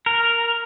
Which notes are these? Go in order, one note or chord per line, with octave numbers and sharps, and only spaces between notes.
A#4